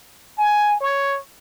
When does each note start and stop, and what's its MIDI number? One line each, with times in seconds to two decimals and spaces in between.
0.38 0.79 80
0.81 1.19 73